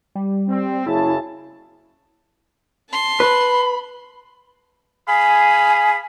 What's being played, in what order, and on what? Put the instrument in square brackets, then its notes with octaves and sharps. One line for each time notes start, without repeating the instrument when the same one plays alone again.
[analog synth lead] G3
[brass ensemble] C4
[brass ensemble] F#1 C#3 A5 [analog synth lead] E4
[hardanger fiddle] A5 C6
[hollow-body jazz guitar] B4 [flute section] B5
[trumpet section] G#4 F5 B5 [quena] G#5